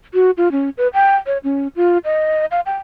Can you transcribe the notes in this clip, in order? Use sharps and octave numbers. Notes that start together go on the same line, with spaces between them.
F#4
F4
C#4
B4
G5
C#5
C#4
F4
D#5
F5
G5